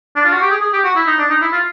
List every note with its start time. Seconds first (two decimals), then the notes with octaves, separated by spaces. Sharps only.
0.16 D4
0.25 F4
0.33 F#4
0.42 G4
0.50 G#4
0.61 G#4
0.73 G4
0.85 F#4
0.96 E4
1.07 D#4
1.19 D4
1.30 D#4
1.42 E4
1.53 F4